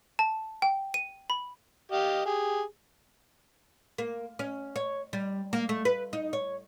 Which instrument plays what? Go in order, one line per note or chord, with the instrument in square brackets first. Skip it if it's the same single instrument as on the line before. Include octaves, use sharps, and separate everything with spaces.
[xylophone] A5
G5
D#7
B5
[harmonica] G4 D#5 F5
G4 G#4
[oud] A#3
C#4
C#5
G3
A#3
A3
B4
D#4
C#5